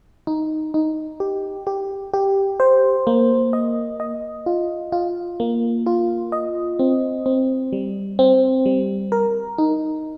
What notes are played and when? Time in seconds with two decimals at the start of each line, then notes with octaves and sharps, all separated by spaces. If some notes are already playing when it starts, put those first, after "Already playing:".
0.27 D#4
0.74 D#4
1.20 G4
1.67 G4
2.13 G4
2.60 C5
3.07 A#3
3.53 D#5
4.00 D#5
4.46 F4
4.92 F4
5.40 A#3
5.86 F4
6.32 D#5
6.79 C4
7.26 C4
7.73 G3
8.19 C4
8.66 G3
9.12 A#4
9.58 D#4